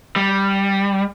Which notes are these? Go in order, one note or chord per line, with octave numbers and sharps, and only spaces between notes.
G3